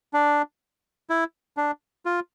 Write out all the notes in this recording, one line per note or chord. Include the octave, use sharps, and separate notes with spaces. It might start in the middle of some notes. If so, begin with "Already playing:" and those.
D4
E4
D4
F4